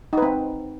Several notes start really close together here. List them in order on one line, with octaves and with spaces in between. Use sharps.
D#4 B4 C4